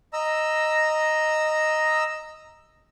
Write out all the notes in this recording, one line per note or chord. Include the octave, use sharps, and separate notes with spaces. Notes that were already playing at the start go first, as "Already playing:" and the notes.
D#5 A#5 E6